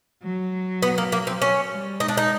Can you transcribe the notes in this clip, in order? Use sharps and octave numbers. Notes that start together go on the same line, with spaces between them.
F#3
B3
A#3
A#3
C4
C#4
G3
G#3 D#4
D4
D#4